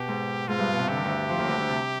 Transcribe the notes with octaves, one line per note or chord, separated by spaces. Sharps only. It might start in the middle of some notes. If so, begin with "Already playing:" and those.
Already playing: B2 G4
G#2
G#2 F4
G2
B2
C3
D3 G4
D#3
D2 D3
F2 F3
D#2 D#3
D2 D3
D2 D3
C3